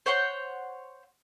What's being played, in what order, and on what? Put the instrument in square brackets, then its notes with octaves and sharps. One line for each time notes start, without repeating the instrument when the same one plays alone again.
[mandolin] C5 C#5 F#5 C6